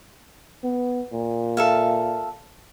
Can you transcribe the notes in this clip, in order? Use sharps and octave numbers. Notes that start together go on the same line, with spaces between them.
B3
A#2
A4 E5 F5